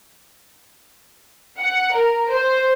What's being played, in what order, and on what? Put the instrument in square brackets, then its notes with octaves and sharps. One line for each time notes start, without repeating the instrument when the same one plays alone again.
[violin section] F#5
A#4
C5